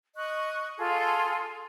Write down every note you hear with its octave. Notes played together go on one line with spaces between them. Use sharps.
D#5 C#6 F#6
F4 G#4 A4 C6